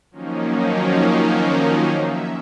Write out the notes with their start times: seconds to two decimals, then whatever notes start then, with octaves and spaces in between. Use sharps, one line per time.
0.11 D#3 F3 F#3 A#3 C#4 D#4
1.98 E5